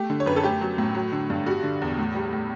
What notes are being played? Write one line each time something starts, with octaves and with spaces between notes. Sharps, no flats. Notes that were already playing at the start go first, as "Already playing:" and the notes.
Already playing: A3 G4
D3
C#5
F#2 B4
A4
A3 G4
F#3
A2
F#3
D3
G2
G3 F#4
D3
E2
A2
G3
A2